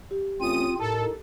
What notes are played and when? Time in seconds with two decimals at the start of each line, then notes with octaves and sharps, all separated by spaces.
0.11 G4
0.41 E2 A3 C4 C#4 F4 D#6 D#7
0.79 A2 D#4 A4 A#4